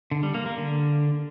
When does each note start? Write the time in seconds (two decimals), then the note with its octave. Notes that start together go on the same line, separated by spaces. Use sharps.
0.11 D3
0.23 G3
0.34 A#3
0.46 A#3
0.57 D3